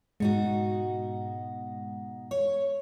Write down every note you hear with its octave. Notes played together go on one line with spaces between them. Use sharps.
G#2 B2 G#3 D#4 F#4
C#5